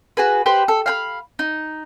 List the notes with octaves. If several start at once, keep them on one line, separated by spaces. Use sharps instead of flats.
F#4 G#4 B4
G4 B4 C5
A4
F5 G5 B5
D#4